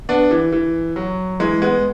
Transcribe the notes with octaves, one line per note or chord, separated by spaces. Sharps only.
B3 D4
E3
E3
F#3
E3 G#3
G#3 B3